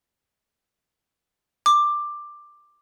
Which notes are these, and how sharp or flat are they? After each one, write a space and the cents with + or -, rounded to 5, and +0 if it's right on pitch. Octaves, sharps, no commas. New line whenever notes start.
D6 +10